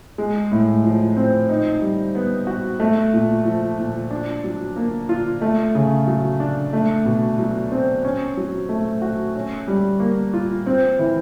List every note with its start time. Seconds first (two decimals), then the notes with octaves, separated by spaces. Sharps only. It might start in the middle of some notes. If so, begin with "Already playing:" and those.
0.18 G#3
0.52 A2
0.84 F3
1.16 C4
1.49 D#4
1.81 G3
2.15 B3
2.47 F#4
2.80 A3
3.14 A#2
3.45 F3
3.79 A#2
4.11 D4
4.44 F#3
4.76 A#3
5.09 F4
5.42 A3
5.75 C#3
6.07 F#3
6.40 D4
6.73 A3
7.05 B2
7.39 F#3
7.72 C4
8.05 C#4
8.37 F#3
8.69 A3
9.02 F#4
9.36 C#4
9.68 G3
10.00 A#3
10.34 F4
10.67 C4
10.99 E3